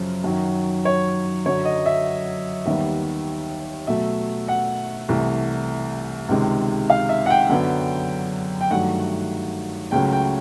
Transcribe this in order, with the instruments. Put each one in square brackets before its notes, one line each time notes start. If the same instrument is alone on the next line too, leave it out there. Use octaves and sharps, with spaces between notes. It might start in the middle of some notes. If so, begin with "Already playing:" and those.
Already playing: [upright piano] F#2 C#3 F3
F#2 D#3 F#3
C#5
F#2 D3 F#3 C#5
D#5
E5
D#2 D#3 G3 B3 E5
B2 F#3 A3 E5
F#5
C2 C3 E3 A3
C#2 C3 D#3 G#3
F5
E5
F#5
G5
F#2 D3 F#3 B3
G5
G2 D#3 F#3 A3 F#5
C#2 C#3 F#3 A3 G5
G5